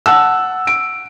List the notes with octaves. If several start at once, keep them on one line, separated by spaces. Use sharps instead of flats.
F#5 A5 E6
D7